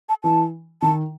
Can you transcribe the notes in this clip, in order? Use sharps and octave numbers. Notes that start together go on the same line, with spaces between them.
A5
E3 A5
D#3 A5